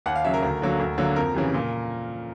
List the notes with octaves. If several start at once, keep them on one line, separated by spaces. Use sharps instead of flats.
D#2 F#5
F5
C#3 F#3 E5
A#4
D2
D3 F#3 A#3
D2
D3 F#3 A#3
F2 A#4
C#3 E3 G3
A#2